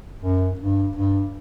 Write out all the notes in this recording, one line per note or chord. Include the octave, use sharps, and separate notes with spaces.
F#2
G2
G2